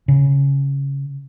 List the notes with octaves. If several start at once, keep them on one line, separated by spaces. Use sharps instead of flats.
C#3